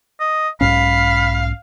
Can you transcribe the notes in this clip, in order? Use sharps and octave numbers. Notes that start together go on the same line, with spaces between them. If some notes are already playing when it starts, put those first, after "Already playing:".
D#5
B1 G#2 C#4 F5 B5